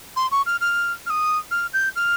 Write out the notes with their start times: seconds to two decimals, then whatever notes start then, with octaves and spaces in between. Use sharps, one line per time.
0.16 C6
0.31 C#6
0.46 F6
0.61 F6
1.06 F6
1.10 D#6
1.51 F6
1.73 G6
1.96 F6